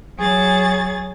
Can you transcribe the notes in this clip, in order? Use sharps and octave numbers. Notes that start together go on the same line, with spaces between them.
F#3 G#4 A6